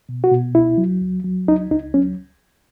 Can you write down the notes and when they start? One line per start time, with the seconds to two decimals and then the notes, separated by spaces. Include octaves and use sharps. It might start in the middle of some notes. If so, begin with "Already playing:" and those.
0.09 B2
0.24 F#4
0.32 B2
0.55 C#2 E4
0.78 F#3
1.02 C#2
1.24 F#3
1.48 C#2 D#4
1.71 C#2 D#4
1.94 F#3 C#4